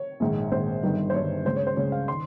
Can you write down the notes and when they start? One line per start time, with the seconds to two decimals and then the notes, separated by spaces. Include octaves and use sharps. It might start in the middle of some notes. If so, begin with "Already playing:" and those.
Already playing: C#5
0.20 A#1 G#2 D#3
0.51 A#1 G#2 D#3 C5
0.83 G1 G2 D#3
1.10 C5
1.14 G1 G2 D#3 C#5
1.45 C#2 C#3 C5
1.56 C#5
1.67 C5
1.76 C#2 C#3 C#5
1.92 F5
2.08 D#3 C6